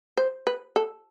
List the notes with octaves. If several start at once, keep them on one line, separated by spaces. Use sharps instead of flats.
C5
B4
A4